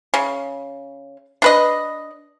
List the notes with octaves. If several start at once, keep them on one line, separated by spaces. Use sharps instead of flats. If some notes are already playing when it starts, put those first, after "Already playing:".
C#3
D4 B4 D#5